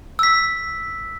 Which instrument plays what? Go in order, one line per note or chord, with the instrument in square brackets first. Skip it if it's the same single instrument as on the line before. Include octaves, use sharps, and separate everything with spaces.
[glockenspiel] E6 B6